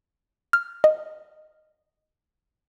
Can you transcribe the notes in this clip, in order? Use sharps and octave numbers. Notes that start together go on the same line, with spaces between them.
F6
D#5